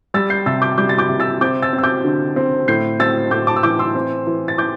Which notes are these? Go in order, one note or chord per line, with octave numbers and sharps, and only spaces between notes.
G3 E6 A6
G6 C7
C3 E6 A6
D6 G6
G3 D6 G6
A6
D6 G6
C3
E6 A6
C4 D6 G6
E6 A6
C4
E6
D6 G6
D3
C4
A2 G6 C7
C4 E6 A6
A2 D6 G6
A5 D6
E6
E3 D6 G6
C6 E6
C4
E3
A6
E3 D6 G6